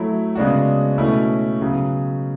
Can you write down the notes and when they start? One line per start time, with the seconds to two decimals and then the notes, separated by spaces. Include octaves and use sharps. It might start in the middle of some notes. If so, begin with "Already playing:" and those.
Already playing: F#3 A3 E4
0.35 C#3 G#3 B3 D4 F#4
0.98 B2 A3 C#4 E4
1.61 C#3 F#3 B3